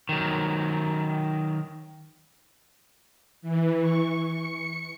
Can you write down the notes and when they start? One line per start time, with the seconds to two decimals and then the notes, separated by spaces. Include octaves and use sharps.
0.09 D#3 F#3
3.42 E3
3.79 C#6
4.21 C#7